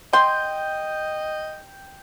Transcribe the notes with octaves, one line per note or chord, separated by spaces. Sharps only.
D#5 G5 C6